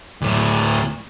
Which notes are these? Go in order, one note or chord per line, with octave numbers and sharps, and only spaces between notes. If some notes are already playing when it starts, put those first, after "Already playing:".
D2 A2